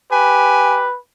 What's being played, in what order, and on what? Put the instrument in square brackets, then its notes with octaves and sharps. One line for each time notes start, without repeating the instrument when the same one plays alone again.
[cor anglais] G4 [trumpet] B4 [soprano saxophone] G#5